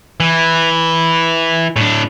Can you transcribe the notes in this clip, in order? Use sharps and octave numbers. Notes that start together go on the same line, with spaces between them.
E3
A2 D4